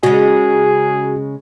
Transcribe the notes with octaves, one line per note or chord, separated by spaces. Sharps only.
C#3 G#3 F#4 G#4